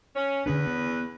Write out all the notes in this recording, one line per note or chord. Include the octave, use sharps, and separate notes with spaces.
C#4
E2 D3 C#4 D4 B4
B3